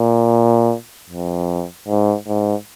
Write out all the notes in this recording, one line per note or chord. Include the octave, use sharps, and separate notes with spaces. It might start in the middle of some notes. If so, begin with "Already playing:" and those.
Already playing: A#2
F2
G#2
G#2